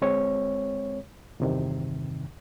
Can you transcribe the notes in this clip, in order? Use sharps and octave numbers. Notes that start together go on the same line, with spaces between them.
D2 G#3 C4 C#5
E2 G2 C3 D#3